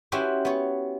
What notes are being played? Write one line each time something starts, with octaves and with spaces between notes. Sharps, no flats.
C#4 E4 F#4 G4 B4 C5
B3 C#5